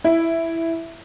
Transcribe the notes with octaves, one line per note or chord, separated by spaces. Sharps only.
E4